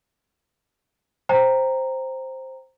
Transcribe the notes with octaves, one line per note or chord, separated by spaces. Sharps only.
C5 G5 A#5